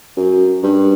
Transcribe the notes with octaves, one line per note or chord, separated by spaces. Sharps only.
F#2
G2